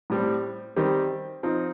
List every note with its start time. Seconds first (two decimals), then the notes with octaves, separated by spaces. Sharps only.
0.10 A2 G3 C4
0.76 D#3 G3 C4 G4
1.43 F3 C4 D#4